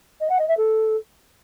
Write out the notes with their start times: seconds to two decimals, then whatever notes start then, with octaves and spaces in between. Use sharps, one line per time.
0.20 D#5
0.30 F#5
0.39 D#5
0.48 E5
0.57 A4